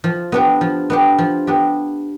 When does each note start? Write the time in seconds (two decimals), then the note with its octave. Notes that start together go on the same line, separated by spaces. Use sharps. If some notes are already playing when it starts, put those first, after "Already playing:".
0.04 F3
0.32 B3 D4 G4
0.61 F3
0.90 B3 D4 G4
1.18 F3
1.47 B3 D4 G4